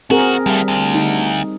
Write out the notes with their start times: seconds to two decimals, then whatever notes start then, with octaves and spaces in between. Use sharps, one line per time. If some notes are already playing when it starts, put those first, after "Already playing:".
0.10 E2 C4 F#4 G#4 A#4
0.46 D#2 G3 A3
0.68 D2
0.94 D#4